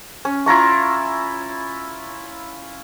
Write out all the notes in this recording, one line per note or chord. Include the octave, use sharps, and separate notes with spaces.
C#4
E4 F4 A#5 C#6